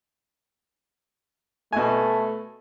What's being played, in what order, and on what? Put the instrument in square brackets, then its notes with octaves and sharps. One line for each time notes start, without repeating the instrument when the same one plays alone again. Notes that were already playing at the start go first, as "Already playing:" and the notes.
[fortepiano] B2 G#5 [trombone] A3